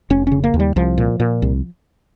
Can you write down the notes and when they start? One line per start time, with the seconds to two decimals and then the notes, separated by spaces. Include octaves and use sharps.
0.10 F1 C#4
0.27 C#3 C#4
0.44 A#3
0.54 D#2
0.60 G3
0.76 C2 F3
0.98 A#2
1.20 A#2
1.42 C2